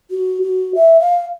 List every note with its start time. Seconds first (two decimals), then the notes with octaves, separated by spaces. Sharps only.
0.11 F#4
0.42 F#4
0.75 E5
1.00 F5